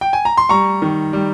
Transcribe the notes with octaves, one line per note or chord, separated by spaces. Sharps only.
G5
G#5
A#5
C6
G3 A#5 C#6
D#3
G3